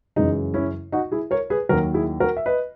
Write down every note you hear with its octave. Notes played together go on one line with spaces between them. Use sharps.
F#2 C#3 E3 G#3 D#4
C#4 E4
D#4 F#4
E4 G#4
A#4 C#5
G#4 B4
D#2 D#3 F#3 F#4 A#4
E4 G#4
F#4 A#4
E5
B4 D#5